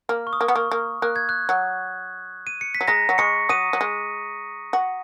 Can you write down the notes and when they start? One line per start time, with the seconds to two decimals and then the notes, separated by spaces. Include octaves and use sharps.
0.09 A#3 F6
0.27 C#6
0.33 D#6
0.41 A#3
0.48 B3
0.55 A#3 C#6
0.72 A#3
1.02 A#3 F#6
1.16 G#6
1.29 F#6
1.49 F#3
2.47 D#7
2.61 C#7
2.75 B6
2.81 F#3
2.88 G#3 A#5 A#6
3.09 F#3
3.18 G#3 C#6 C#7
3.49 F#3 D#6 D#7
3.73 F#3
3.81 G#3
4.73 F#4